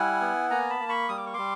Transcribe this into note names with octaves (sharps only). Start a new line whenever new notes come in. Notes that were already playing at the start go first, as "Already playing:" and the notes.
Already playing: G3 E4 F#5 G#5
B3
A#3 G#5 A#5
A5 B5
A#3
B5 C#6
G3 D#6
D6
C#6
G3 C6 D6